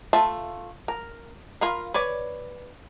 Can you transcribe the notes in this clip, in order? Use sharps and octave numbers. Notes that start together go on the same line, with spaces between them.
A3 F4 E5 A5
A#4
F4 A#4 F5 B5
B4 C#5 D5